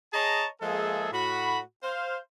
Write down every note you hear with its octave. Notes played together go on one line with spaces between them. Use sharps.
G#4 C#5 D#5 A5 A#5
F3 G#3 A#3 G#4 A4 E5
A2 F#4 B5
C5 F5